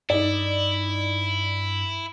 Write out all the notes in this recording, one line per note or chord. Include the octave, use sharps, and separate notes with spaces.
G2 D#4 E4 D5